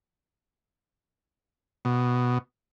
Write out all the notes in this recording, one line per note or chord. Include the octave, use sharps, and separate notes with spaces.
B2